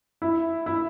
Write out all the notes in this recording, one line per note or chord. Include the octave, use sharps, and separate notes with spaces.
E4
E4